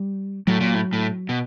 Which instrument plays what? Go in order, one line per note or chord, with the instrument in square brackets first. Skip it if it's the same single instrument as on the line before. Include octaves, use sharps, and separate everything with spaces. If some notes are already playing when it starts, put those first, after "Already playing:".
Already playing: [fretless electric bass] G3
[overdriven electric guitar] A2 [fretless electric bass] F#3
[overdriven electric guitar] A#2
A2
A2
B2